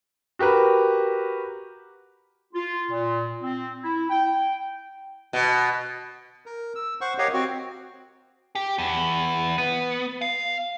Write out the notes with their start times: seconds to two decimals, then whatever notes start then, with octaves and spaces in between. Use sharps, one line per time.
0.39 F#4 G4 A#4 B4
2.53 F4
2.90 A#2
3.42 C4
3.84 E4
4.10 G5
5.33 B2
6.46 A#4
6.76 E6
7.01 C5 F#5 C#6
7.18 G4 A#4 C#5 D#5 F5 F#5
7.34 C4 F#4
8.55 G4
8.78 E2
9.58 B3
10.21 F5